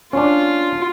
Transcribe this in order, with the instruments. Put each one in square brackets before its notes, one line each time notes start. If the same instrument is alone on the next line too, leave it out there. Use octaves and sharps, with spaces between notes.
[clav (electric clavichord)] C#4 D4 [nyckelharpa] F4